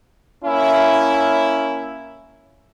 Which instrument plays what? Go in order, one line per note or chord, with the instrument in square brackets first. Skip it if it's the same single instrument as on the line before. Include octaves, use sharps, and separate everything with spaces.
[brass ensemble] A#3 C#4 E4